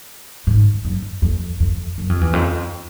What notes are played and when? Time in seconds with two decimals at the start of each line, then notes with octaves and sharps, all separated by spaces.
0.47 G#2
0.85 F#2
1.22 F2
1.60 F2
1.98 F#2
2.10 F2
2.21 E2
2.33 F2